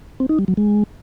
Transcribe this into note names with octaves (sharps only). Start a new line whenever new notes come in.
C4
D#4
G3
F#3
G#3